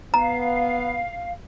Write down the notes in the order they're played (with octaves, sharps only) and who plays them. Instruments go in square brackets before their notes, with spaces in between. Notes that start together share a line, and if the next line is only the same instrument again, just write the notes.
[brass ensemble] B3 [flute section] F5 [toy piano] A#5